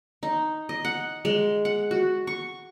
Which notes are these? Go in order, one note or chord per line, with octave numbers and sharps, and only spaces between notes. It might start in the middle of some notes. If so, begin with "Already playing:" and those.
D#4
D#5
F#5
G#3
F#5
F#4
C#6